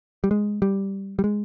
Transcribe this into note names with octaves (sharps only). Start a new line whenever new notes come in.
G3
G#3
G3
G3
G#3